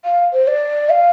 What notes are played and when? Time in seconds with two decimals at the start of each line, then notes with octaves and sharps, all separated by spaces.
0.05 F5
0.33 C5
0.47 D5
0.90 F5